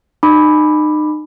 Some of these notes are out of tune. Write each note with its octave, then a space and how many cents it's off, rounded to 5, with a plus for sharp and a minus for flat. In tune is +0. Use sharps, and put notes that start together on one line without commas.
D#4 -35 B5 +0 D6 +10